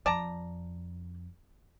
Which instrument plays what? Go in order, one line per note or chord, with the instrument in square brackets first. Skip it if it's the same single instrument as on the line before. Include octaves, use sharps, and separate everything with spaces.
[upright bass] F2 [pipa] D5 A5 A#5